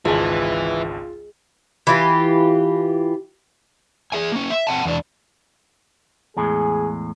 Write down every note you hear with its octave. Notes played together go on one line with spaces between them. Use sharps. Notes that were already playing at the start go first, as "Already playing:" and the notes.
G#1 C#2 E3 G#3 F4 G5 A5
E3 F4 G4
G#4 E5 G#5
A#3 C#4
E5
C4 F#5 A5
E2 D4
E2 A2 G#3 G#4